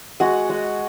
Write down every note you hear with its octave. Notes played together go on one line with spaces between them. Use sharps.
G#3 F#4 F#5
G#3